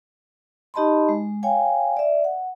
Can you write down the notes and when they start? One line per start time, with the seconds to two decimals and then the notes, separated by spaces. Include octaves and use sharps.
0.74 D#4 G4 D#5 A5 B5 C6
1.09 G#3
1.43 C#5 F5 G5 G#5
1.97 D5 E5
2.24 F#5